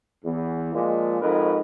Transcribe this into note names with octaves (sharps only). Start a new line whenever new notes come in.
E2
A#2 F3 G#3
F2 G#2 A#4 B4